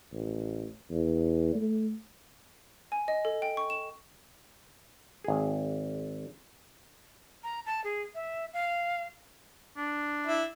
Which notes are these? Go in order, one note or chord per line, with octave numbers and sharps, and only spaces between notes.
A1
E2
A3
G#5
D#5
A4
G5
C#6
E7
G#1 G#4
A#5
A5
G#4
E5
F5
D4
E4